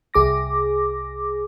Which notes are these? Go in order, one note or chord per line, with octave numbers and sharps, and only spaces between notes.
C2 G#4 D6 A#6